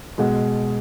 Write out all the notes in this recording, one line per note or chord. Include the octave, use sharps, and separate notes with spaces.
B2 G#3 F#5